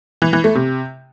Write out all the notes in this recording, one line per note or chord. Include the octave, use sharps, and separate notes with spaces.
E3
E3
A3
C3